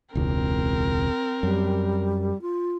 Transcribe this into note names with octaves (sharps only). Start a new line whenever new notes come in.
E1 C#2 C4 A#4
F#2 G3
F4